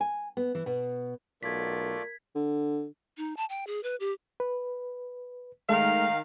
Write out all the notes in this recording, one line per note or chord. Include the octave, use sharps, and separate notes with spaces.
G#5
B3
E3
B2
B1 A3 F4 A#4 D5 G#6 B6
D3
D#4
A5
G5
G#4
B4
G4
B4
D#3 G#3 A3 F5